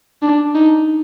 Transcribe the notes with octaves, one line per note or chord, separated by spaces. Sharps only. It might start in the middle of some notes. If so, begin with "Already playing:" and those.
D4
D#4